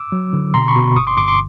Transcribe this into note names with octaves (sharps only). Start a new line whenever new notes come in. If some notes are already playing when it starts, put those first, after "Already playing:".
Already playing: D6 E6
F#3
D3
B2 A#5 C6
B5 C#6
B2
G1 C#6 D#6
C6 D6
G1 C6 D6
C6 D6